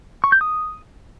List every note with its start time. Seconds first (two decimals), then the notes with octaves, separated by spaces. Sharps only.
0.24 C#6
0.32 G6
0.41 D#6